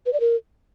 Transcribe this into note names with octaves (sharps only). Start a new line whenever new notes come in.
B4
D5
A#4